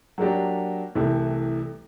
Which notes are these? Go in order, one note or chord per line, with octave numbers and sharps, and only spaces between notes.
F#3 A#3 D4 G4
C2 C3 E3 A3